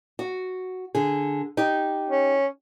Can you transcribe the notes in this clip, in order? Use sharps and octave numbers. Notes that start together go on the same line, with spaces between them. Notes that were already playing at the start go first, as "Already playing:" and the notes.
F#4
D3 G#4
D#4 G4
C#4